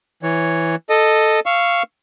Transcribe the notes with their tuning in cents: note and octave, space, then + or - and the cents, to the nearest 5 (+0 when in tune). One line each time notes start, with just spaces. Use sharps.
E3 +0 C#5 +0
A4 +0 D#5 -10
F5 -10 C#6 +0 E6 +0